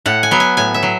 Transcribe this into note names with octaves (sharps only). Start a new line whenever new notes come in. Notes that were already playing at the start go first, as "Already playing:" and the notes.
A2 F#5
G#5
F#3 B3
G#5
A2 G#5
E5
F#3